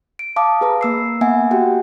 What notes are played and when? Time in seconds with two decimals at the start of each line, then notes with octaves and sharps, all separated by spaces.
0.19 D7
0.36 F5 A5 D6 D#6
0.61 G#4 B4 A#5
0.81 A#3 E6 C7
1.21 A#3 B3 E5 F#5 G#5
1.51 F#4 G4 F#5 G5